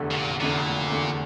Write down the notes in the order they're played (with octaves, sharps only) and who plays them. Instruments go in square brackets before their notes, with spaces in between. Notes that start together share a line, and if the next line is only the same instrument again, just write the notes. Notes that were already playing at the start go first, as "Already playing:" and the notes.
Already playing: [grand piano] F1 E2 D3 A3
[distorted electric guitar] C#3
A#2
[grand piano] F1 E2 D3 A3 [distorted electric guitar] A#2
[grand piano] F1 E2 D3 A3